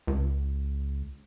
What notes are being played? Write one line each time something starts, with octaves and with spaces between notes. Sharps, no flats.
C#2